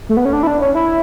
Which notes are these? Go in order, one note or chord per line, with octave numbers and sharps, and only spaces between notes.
A3
B3
C#4
D4
E4
D4
C#4
E4